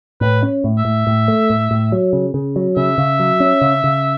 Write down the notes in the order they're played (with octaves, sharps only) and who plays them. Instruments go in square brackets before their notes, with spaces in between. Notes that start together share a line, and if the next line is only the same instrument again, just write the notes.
[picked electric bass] A2 [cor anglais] B4
[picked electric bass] C#4
A2
[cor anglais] E5
[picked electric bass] A2
A2
A3
A2
A2
F#3
C#3
C#3
F#3
[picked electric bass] C#3 [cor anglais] E5
[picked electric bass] C#3
F#3
C#4
C#3
C#3